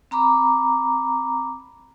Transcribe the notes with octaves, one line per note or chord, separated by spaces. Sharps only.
C4 A#5 B5 D6